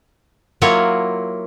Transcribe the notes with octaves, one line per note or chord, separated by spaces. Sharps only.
F#3 A#3 E4 F4 A#4 C#5